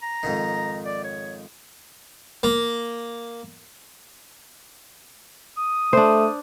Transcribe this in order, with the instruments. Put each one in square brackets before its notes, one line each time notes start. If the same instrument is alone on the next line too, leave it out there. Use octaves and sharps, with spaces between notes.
[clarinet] A#5
[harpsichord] F2 G#2 D#3
[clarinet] D5
C#5
[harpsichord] A#3
[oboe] D#6
[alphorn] A3 [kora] D4 C5